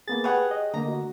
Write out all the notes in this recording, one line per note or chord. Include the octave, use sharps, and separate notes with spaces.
A#3 B3 G#4 A6
G4 G#4 B4 C#5 F#5 G5
D#5
D3 A3 A#3 A#5
F#4